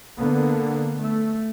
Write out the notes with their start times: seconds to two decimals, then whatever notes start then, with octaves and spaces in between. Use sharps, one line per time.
0.18 D3 A#3 B3
0.99 A3